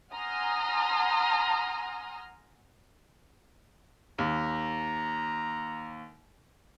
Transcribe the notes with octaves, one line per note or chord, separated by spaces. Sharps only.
F#5 G#5 A#5 C6 D#6 F6
D#2 A#5